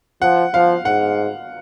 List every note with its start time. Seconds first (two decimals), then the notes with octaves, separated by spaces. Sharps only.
0.22 F3 F#5
0.54 F3 F5
0.85 G#2 F#5